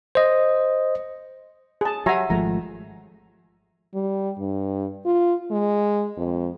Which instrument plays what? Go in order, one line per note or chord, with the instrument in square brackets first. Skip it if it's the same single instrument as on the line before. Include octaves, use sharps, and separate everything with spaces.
[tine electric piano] C5 D#5
[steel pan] G#4 A5
[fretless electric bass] F#3 [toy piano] G4 F#5 [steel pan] E5 G#5 A#5
[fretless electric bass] G#1 G#3 A3 [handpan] F3 [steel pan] A#5
[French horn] G3
G2
F4
G#3
F2